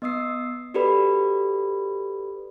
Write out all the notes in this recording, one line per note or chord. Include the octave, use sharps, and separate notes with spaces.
B3 D#5 D#6 E6 C7
F#4 G4 A4 B4 D5 B5